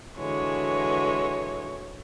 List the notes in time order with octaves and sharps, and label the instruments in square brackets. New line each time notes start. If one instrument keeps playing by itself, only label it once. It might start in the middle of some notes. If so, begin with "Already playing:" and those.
[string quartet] D3 E3 G#3 [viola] F#4 C#5